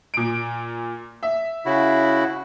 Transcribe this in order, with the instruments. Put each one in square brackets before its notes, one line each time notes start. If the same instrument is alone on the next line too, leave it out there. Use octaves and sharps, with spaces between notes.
[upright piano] A#2 D7
E5
[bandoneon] C#3 E4 F#4